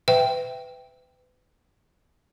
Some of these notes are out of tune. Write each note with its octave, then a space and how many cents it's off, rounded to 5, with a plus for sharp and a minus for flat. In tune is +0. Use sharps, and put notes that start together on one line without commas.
B4 +30 E5 +0 G5 +0